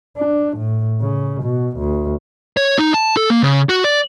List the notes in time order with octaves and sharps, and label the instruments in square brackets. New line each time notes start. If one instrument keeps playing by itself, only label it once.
[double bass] D4
A2
C#3
B2
D2
[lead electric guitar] C#5
D#4
A5
A4
A#3
C#3
F#4
D5